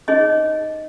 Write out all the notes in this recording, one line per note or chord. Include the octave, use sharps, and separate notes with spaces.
D#4 G#4 C#5 D#5